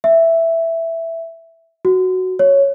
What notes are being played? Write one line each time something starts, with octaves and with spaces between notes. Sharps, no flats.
E5
F#4
C#5